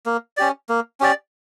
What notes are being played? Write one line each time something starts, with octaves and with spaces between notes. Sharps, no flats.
A#3
C#4 G4 D5
A#3
C#4 G4 D5